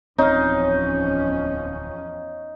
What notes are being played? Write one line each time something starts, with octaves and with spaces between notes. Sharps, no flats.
D1 E2 F3 C4 C#4 D#4 C#5 F5